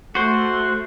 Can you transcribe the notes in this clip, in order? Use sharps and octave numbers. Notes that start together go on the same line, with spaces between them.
A3 F#4 C5